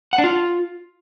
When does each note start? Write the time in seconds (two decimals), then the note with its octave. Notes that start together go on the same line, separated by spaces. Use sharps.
0.13 F#5
0.18 D4
0.24 F4